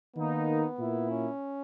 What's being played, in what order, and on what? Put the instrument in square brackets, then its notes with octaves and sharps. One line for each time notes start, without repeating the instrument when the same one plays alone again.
[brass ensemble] D#3 A#3 D#4 [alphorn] B3
[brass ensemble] A#2 A#3 E4
[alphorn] C#4